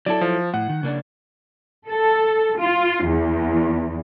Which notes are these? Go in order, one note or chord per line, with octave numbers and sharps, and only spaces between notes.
F#3 E4 A4 D5 A5
F3
A2 F#5
D#3
C#3 A#3 D4
A4
F4
E2